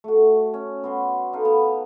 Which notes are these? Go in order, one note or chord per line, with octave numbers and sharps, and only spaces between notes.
A3 F#4
C#4
B3 F#4 C6
D#4 A4 B4 F5
B3